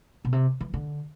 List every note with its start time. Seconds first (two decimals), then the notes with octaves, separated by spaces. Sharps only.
0.25 B2
0.32 C3
0.61 E3
0.74 D3